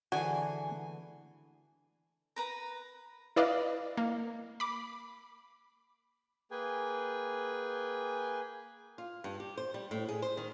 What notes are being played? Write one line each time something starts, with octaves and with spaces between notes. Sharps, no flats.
D3 E3 F#4 G#4 G#5
A#4 B4 A#5
E4 B4 D5 D#5 F5
A#3
B5 D6
A#3 G#4 B4 G5 G#5
F4
G2
G4
C5
G3
A2
G#4
C5
D#3